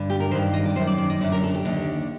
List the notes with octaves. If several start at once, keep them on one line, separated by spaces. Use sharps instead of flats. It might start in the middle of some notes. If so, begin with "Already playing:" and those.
Already playing: G2 D3
G4
A#4
G2 D#3 C5
D5
D#5
D5
F#2 D#3 C5
D5
D5
D#5
F#2 D3 D5
A#4
A4
G4
D#2 D3